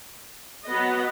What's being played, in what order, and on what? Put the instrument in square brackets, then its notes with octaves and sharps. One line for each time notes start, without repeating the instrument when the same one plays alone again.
[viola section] F#3 B3 F#4 B4 D#5